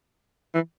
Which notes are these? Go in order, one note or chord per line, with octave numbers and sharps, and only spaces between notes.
E3